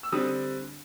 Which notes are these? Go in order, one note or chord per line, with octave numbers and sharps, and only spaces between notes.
E6
D3 G3 C4 D#6